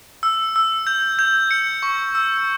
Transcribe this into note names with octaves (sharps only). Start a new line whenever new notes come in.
E6
E6
G6
G6
C#7
C#6
E6